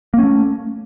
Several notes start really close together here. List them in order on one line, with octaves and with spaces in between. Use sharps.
A#3 C#4 A3